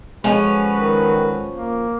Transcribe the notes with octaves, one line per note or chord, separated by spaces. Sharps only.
F3 G#3 C#4 F#4 A4 B4
D#3
A#3